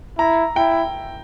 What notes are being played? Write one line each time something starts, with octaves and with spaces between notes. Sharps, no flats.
E4 A#5
E4 G5